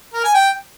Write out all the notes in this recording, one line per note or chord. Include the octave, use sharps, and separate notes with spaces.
A#4
G#5
G5